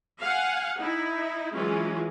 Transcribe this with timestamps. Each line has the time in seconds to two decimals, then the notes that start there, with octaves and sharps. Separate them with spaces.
0.20 F5 F#5 G#5
0.79 D#4 E4
1.53 E3 F#3 G#3 C#4 F4